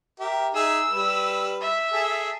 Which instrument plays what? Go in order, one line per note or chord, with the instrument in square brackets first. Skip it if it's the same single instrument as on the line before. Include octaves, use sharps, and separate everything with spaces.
[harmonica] G4 A#4 E5
[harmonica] D#4 G#4 E5 [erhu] E6
[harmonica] G3 B4
[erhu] E5
[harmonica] G#4 A4